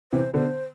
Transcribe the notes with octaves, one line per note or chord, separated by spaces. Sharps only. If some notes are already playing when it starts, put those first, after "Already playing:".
C3 E3 C5
B2 D3 C5